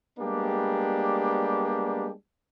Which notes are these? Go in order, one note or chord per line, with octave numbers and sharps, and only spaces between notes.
G3 G#3 A#3 B3 D4 G4